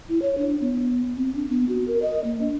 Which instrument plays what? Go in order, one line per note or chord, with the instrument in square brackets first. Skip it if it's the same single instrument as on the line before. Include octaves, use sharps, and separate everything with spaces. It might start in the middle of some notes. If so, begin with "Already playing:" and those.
[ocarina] E4
C#5
D4
B3
C4
D4
B3
F#4
A#4
D#5
A#3
D4